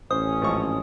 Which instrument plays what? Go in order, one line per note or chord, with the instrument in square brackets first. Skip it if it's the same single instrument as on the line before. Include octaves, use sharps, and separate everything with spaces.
[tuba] A1 [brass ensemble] C#4 [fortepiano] C5 [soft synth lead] D#6
[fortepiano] G#1 F3 C#6